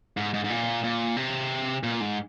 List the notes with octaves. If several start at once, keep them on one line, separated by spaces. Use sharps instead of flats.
G#2
G#2
G#2
A#2
A#2
C3
A#2
G#2